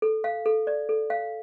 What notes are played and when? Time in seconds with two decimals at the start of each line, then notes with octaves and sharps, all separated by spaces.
0.02 A4
0.24 F5
0.46 A4
0.67 D5
0.89 A4
1.10 F5